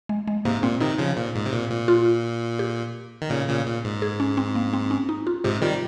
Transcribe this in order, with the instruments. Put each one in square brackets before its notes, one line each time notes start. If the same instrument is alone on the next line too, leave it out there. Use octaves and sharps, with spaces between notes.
[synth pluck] G#3
G#3
[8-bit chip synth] G#2 C3 [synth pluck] A#3
[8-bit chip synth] A#2 [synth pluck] C4
[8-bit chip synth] C3 D#3 [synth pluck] D#4
[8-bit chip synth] C#3 F3
A#2
G#2
C3
A#2
A#2
[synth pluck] F4
G4
[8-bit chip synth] D#3
A#2 C#3
A#2 C#3
A#2
G#2
[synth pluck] G#4
C#4
C4
A#3
C4
C#4
D#4
F4
[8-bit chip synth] G#2 C3 [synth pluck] G4
[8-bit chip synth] D#3 G3 [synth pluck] F4